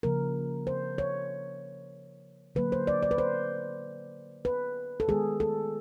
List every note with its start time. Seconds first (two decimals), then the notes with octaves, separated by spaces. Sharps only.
0.03 C#3 F3 A#3 A#4
0.67 C5
0.98 C#5
2.55 D3 F#3 A#3 B4
2.72 C5
2.87 D5
3.03 D5
3.11 B4
3.18 C5
4.45 B4
5.00 A4
5.08 D#3 G#3 B3 G#4
5.40 A4